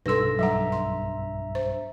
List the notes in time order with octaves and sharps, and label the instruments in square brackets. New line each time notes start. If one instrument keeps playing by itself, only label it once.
[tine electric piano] B1 G2 E6 [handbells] A4 A#6 [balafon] B4 C6
[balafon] F#3 G3 F#5 [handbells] E5 A#5
[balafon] C6
C5